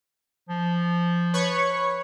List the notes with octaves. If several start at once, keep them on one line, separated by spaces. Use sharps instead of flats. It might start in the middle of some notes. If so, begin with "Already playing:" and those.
F3
B4 C#5 C#6